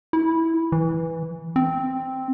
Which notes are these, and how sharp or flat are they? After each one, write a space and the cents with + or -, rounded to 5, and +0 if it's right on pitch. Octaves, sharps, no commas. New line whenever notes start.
E4 -10
E3 -5
C4 +0